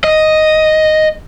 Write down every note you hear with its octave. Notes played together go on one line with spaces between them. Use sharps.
D#5